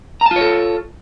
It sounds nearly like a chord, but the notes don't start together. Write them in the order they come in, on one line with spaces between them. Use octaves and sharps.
A#5 A5 F4 C#5 A4